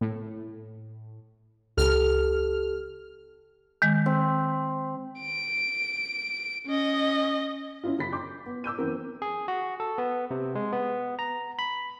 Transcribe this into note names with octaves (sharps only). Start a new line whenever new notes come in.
A2
C#2 G4 A4 F6
D#3 G#3
C4
D7
C#4 D#5
C#4 E4 F4
F#2 C#3 B5 B6
C6 D6 G6
B3
D6 E6 G6 D#7
F#2 E3 B3 C4 A#4
G#4
F#4
A4
B3
C3
G#3
B3
A#5
B5